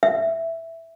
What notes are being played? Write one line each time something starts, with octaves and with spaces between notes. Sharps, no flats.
E5